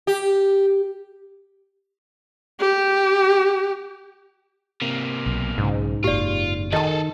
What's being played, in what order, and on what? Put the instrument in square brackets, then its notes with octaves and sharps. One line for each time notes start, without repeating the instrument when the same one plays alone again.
[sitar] G4
[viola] G4
[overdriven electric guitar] C3 A#3
[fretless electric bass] B1
[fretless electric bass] B1 C#3 [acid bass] G#2
[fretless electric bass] F#1 A#2 [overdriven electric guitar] F4 [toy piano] G4 D5
[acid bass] D#3 [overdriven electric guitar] G#4 A4 [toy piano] D#5 A5